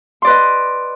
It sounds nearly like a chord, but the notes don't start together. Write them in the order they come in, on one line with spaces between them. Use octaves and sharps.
C6 D5 B4 D#5